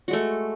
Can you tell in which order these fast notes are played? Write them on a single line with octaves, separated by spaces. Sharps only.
F#4 G#3 A3